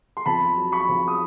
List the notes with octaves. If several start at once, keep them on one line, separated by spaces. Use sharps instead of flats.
C6
F2 A5 B5
F#3
B5 C#6
F2
D#6